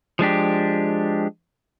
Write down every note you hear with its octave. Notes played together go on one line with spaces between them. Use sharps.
F3 G#3 D4 G4